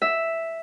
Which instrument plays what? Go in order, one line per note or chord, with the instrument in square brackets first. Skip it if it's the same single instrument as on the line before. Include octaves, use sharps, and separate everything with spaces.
[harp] E5